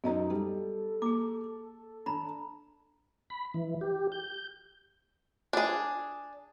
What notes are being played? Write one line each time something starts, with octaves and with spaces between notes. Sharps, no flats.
F#2 B3 D#4 A4 D#5 A#5
G3
A#3 G#4 D6
D4 A#5 B5
B5
E3
G4
G6
D4 G#4